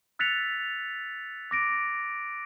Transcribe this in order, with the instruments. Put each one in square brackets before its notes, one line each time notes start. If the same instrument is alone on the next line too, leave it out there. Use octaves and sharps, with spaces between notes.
[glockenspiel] E6 F#6 A6 B6 C#7 F7
D6 A#6 D7